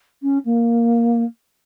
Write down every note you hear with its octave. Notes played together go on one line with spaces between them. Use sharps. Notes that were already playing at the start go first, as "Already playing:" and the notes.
C#4
A#3